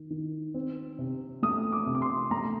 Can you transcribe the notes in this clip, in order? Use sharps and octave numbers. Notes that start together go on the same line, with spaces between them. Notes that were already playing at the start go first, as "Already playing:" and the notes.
Already playing: D#3
D#3
C4
C3
A3 D#6
D6
C3
D6
C6
A3 A#5